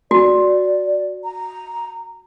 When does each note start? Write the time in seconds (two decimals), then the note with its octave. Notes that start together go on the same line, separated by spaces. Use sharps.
0.11 F#4 D5
1.24 A#5